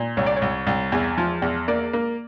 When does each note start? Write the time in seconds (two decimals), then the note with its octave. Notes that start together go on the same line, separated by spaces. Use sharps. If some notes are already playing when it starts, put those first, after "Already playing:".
Already playing: A#2
0.17 C2 C#5
0.26 D5
0.36 C#5
0.42 C2
0.67 C2
0.92 E2
1.18 F3
1.42 E2
1.68 A#3 D5
1.93 A#3